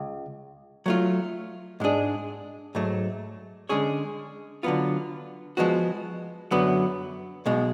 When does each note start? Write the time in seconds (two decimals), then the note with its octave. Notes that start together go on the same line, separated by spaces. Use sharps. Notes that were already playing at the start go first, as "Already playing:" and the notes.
Already playing: C#2
0.86 F#3 A3 F4
1.80 G#2 G#3 D4 G#4
2.75 G#2 F#3 A3
3.69 D3 G#3 C#4 G#4 C#5
4.63 D3 F#3 B3 F4
5.57 F3 G#3 B3 F#4
6.51 F#2 D3 F#3 B3
7.46 B1 B2 G#3